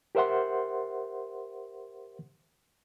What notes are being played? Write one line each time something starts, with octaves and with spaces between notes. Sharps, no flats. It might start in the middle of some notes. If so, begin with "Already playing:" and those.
G4 A#4 C5 E5 F#5 C6